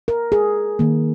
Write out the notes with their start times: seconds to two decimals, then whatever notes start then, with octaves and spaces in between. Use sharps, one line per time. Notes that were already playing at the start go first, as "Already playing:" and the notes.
0.08 A#4
0.32 G#4
0.79 D#3 A#3